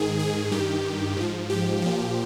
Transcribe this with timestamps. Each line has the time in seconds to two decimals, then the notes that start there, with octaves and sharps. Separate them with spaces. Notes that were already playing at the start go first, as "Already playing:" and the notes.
Already playing: G#2 D#3 G#4
0.19 G#4
0.51 G2 D#3 G4
1.17 G#2 F3
1.50 G4
1.82 A#2 F3